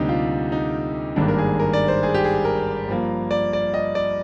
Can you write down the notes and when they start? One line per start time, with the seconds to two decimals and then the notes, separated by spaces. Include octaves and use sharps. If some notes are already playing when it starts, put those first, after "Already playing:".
Already playing: D2 C3 G3 A#3 D4 D#4 G4
0.09 F4
0.52 D#4
1.16 G#1 G2 D#3 A#3 D4
1.28 A#4
1.38 G#4
1.60 A#4
1.73 D5
1.88 C5
2.03 G#4
2.14 G4
2.24 G#4
2.45 A#4
2.88 G2 F3 A#3
3.31 D5
3.53 D5
3.74 D#5
3.95 D5